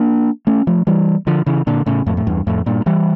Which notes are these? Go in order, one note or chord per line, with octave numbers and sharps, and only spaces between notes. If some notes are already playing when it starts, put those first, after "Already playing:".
Already playing: A#3 D4
A3 C#4
F3 A3
E3 G3
D3 F3
C#3 E3
A#2 D3
A2 C#3
F2 A2
A2
E2 G2
F2 A2
G2 A#2
E3 G3